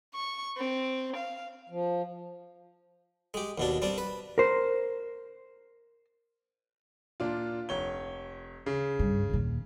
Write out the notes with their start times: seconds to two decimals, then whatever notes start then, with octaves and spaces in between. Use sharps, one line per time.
0.15 C#6
0.57 C4
1.17 F5
1.69 F3
3.34 G#3 G4
3.58 D#2 B2 D4
3.82 G3 C4 D4
3.98 B4
4.38 A#4 C5
7.20 A#2 D4 F4
7.69 F1 C#5 G7
8.66 C#3
8.99 G2
9.30 D#2 A#2